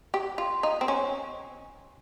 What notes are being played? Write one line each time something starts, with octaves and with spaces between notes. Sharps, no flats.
G4
F4
D#4
C4
C#4